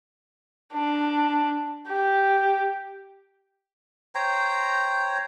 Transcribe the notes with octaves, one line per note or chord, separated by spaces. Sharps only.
D4
G4
C5 C#5 G5 A#5